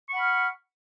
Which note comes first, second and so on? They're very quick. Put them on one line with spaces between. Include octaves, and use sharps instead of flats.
C#6 F#5 B5 F6